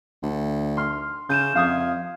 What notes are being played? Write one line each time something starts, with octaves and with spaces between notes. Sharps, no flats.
D2
C6 F6
C#3 G6 D#7 E7
F2 F5 D#6 G#6